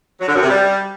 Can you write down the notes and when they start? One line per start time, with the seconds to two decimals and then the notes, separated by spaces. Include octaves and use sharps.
0.20 F#3
0.27 D3
0.35 F#2
0.43 C3
0.50 G3